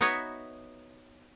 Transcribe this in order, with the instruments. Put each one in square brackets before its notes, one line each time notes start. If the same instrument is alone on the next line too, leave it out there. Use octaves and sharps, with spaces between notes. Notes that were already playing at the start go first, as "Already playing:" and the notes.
[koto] B3 D#4 F#4 B4 C#5 E5